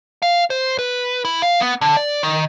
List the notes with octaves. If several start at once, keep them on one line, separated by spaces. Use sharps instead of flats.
F5
C5
B4
E4
F5
B3
D3
D5
D#3